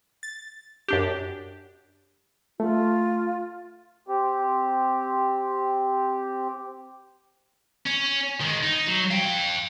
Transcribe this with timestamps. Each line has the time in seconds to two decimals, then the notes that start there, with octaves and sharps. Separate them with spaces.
0.23 A6
0.88 F#2 D4 G4
2.60 A3 F4
4.08 C4 G4
7.86 C#4
8.41 D#3 G#3
8.63 D#4
8.87 F#3
9.10 F5 G5